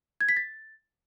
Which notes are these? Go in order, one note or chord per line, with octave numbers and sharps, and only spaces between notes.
G#6
B6
A6